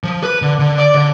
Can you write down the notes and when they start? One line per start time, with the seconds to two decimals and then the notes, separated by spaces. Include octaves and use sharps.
0.04 F3
0.23 B4
0.42 D3
0.59 D3
0.78 D5
0.95 D3